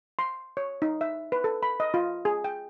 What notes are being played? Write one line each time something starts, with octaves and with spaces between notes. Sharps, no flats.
C6
C#5
D#4
E5
B4
A4
B5
D#5
F4
G#4
G5